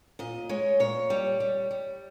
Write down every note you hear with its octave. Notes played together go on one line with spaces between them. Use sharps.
A#2 D#5
G#3 C#5
A#2 C#5
G3
G3
G3